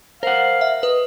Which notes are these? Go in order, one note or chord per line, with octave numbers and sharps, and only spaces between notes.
A#4 C5 F5 F#5
E5
B4 D#5